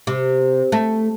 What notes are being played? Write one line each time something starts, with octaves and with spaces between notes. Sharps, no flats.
C3
A3